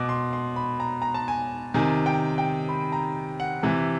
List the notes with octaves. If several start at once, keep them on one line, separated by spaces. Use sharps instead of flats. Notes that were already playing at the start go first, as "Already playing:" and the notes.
Already playing: B2 D6
C6
C6
B5
A#5
A#5
A5
G#5
C3 D#3 G#5
G5
G5
B5
A#5
F#5
C3 E3